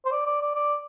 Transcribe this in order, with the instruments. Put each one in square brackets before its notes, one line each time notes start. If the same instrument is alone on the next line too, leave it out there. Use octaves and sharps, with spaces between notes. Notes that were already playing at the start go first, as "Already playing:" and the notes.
[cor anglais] C5
D5
D5
D5
D5